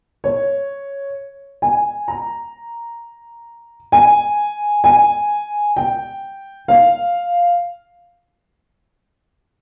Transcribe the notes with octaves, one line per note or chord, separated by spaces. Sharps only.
C#5
G#5
A#5
G#5
G#5
G5
F5